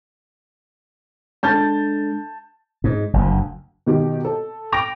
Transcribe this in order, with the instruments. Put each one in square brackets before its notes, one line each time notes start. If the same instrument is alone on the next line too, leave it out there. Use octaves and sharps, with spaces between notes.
[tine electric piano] G#3 D4 A4 [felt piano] A5 G6 A6
[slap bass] G#2
F#1 D2
[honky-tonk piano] B2 D#3 G4
A4
G5 D6 A#6 D7 F7